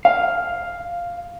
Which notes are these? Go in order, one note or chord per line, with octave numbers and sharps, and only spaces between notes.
F5